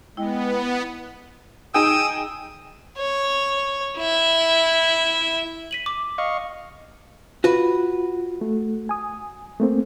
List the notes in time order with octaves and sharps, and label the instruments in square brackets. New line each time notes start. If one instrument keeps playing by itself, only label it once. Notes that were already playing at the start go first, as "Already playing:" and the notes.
[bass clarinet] G#3 [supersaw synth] B3 [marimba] E4 G5
[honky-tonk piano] D#4 G#4 G5 [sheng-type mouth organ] D#6 E6
[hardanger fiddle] C#5
E4 E5
[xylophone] B6 D#7 F#7
D6
[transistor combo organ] D#5 F5 C#6
[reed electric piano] F4 [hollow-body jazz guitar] F#4 B4
[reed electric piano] A3
G#5 D#6
A3 A#3 C4